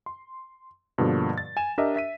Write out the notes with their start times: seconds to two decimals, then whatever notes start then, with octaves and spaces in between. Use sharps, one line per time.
0.06 C6
0.98 G2 B2 D3 F3 A#3
1.38 A6
1.57 G#5 E7
1.78 D4 G4 A#4 D#5 E5
1.96 E5 B6 D#7